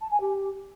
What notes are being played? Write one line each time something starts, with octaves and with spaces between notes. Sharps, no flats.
A5
G#5
G4